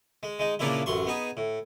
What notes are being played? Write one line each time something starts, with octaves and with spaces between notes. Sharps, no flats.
G#3
G#3 D#4
A#2 C#3 A#3 D4 E4 F4
A1 F#2 C6 C#6
B3 D#4 G#4
A2